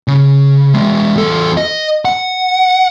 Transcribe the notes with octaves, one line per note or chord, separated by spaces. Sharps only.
C#3
G#3 B3
E2 A4
D#5
F#5